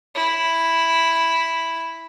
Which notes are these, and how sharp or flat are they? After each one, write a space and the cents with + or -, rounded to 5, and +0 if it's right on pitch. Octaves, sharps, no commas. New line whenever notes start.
E4 +0